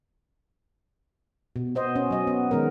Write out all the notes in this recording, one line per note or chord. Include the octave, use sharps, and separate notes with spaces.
B2
B3 C5 D#5
C#4
F#3 D#5
B3
D#3 G#3 B3 A#4